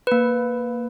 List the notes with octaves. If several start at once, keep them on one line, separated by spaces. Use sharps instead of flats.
A#3 B4